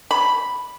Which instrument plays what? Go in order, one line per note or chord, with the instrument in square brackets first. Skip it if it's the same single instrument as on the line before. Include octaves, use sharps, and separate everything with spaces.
[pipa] B5